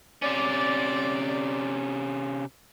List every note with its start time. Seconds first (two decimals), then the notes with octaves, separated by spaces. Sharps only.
0.22 C3 C#4 D5